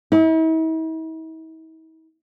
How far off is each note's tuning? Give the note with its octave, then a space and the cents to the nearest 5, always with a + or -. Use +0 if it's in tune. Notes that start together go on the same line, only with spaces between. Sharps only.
E4 -45